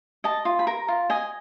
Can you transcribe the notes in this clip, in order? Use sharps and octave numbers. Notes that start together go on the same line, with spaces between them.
D#5 A5
F4
B5
A#4 A#5
F4
D#5 G#5